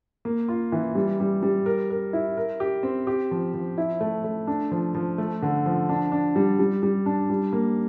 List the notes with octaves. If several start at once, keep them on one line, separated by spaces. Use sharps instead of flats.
A#3
F4
E3
G3
G3
G3
A#4
A#4
E4
A#4
G4
C4
G4
F3
F3
E4
A3
A3
D4
F3
F3
A3
D3
F3
D4
D4
G3
G3
G3
D4
G3
A#3